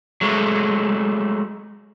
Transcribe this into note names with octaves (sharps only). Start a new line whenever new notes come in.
F#3 G#3 A3